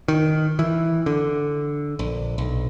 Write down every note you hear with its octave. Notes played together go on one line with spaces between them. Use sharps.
D#3
E3
D3
A#1
B1